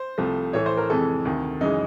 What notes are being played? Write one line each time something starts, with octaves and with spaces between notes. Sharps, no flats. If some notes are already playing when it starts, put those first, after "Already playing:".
Already playing: C5
C2 C3 F3 A3
A2 E3 A3 C#5
C5
A#4
F2 C3 E3 G#3 A4
D2 C3 D#3
F#2 C#3 E3 G#3 D#4